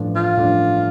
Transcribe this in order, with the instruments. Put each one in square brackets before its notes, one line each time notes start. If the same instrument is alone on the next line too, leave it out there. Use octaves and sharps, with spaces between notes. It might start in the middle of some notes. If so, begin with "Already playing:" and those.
Already playing: [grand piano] A1 G2 F3 A3 D4
[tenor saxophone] F4
[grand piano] A1 G2 F3 A3 D4